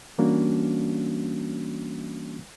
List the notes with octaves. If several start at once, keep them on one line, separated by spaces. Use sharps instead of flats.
E3 G3 A#3 C#4 D4 F#4